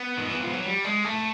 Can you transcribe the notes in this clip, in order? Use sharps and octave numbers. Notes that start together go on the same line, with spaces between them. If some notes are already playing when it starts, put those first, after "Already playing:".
Already playing: B3
D#3
E3
F3
F#3
G3
G#3
A3